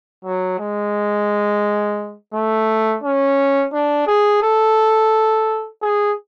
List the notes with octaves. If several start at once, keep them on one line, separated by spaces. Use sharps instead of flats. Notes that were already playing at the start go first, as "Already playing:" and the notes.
F#3
G#3
A3
C#4
D4
G#4
A4
G#4